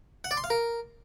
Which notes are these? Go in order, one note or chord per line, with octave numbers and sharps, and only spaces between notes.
F#5
D5
C6
F5
A#4